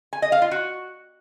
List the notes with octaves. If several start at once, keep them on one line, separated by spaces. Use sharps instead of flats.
G#5
D#5
F5
F4
F#4